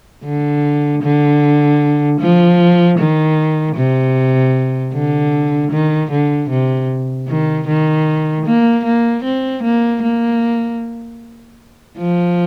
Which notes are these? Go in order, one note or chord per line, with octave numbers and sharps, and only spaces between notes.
D3
D3
F3
D#3
C3
D3
D#3
D3
C3
D#3
D#3
A#3
A#3
C4
A#3
A#3
F3